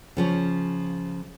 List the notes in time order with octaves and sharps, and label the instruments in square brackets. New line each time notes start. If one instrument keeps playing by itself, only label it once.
[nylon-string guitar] C#3 F3 C#4